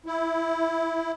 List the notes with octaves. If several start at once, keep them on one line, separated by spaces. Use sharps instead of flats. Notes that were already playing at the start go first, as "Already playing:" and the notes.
E4